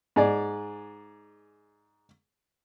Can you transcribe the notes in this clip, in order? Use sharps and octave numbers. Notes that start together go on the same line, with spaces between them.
G#2 G#4 D5